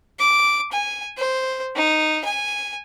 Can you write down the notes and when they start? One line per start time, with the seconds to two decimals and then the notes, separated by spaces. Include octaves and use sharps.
0.19 D6
0.72 G#5
1.17 C5
1.75 D#4
2.24 G#5